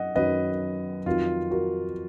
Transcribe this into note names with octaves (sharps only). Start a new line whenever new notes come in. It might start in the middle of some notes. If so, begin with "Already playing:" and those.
Already playing: F#2 D#5 F#5
F#2 D#3 F#3 B4 D#5
F2 D#3 F#3 F4
F#4 A#4